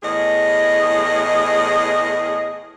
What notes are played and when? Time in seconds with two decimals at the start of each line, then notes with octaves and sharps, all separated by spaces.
0.03 E2 A2 G#4 D#5